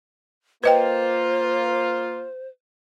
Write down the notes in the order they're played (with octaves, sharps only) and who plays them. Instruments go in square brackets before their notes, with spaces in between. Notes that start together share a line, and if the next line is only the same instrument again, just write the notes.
[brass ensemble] A#3 F4 [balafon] B4 D#5 G5 [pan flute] C5